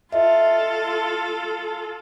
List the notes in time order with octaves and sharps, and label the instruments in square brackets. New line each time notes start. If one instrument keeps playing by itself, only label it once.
[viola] F4 A4 [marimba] D#5 E5